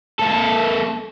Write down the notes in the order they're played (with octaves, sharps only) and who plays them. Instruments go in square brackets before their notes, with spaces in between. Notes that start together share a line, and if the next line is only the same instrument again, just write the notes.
[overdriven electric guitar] A#3 A4